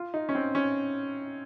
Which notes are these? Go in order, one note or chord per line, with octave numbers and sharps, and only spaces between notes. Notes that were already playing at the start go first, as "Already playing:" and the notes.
Already playing: F4
D#4
C#4
C4
C#4